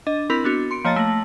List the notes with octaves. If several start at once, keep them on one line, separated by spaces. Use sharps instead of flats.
D4 D#5
C4 E4 A#4 B5 F7
B3 D4 F#4
C6 C#7 D7
F3 A#3 C#5 D#5 A5 A6
A3 A#6 F#7